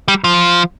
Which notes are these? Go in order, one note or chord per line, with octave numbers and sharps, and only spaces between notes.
G3
F3